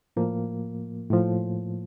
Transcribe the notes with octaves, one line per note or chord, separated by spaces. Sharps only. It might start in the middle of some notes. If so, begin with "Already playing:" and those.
A2 F3 A#3
A2 F3